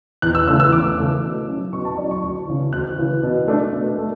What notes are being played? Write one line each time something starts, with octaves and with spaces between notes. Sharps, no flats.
E2 F#6
E6
C#3 E3 A3 E6
E6
E2 D6
C#3 E3 A3
B2
F#3 C#4 E4
B2 C#6
A5
F#3 C#4 E4 D5
C#6
D2
C#3 E3
D2 F#6
C#3 E3
B2
A3 D4
B2
A3